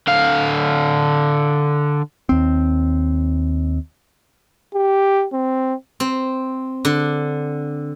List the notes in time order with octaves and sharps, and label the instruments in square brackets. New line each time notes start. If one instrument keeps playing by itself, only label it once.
[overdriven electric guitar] D3 F5
[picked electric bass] D#2 C4
[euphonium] G4
C4
[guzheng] C4
D3